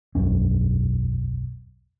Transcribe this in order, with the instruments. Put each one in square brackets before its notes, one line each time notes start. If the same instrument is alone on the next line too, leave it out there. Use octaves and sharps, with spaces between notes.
[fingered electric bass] E1 B1 F#2 C#4